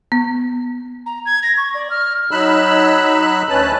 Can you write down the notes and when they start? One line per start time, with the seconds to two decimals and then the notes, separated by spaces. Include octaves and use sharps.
0.12 B3
1.06 A#5
1.26 G#6
1.43 A#6
1.57 C#6
1.74 D5
1.90 F6
2.31 F#3 D#4 B5 E6 F#6
3.49 D2 C#4 B4 A5 F#6